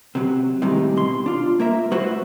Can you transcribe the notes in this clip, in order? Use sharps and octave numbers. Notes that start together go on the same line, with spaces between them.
C3 F#3
A2 C3 D#3 E3 G3 G#3
B2 C6
D4 F4
A#3 A#4 E5
F#3 A3 F#4 B4 C5 E5